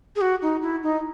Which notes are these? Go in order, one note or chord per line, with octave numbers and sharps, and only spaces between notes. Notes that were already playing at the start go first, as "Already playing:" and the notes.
G#4
F#4
D#4
E4
D#4